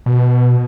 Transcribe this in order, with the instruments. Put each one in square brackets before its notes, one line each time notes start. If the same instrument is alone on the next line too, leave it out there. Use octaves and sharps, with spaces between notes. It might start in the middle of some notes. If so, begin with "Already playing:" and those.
[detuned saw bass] B2